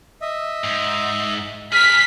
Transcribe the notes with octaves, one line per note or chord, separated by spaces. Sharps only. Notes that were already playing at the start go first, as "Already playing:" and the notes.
D#5 E5
G#2
G#4 A#4 F6 B6